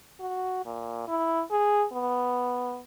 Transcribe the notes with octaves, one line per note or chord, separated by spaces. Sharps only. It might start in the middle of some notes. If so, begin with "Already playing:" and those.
F#4
A#2
E4
G#4
B3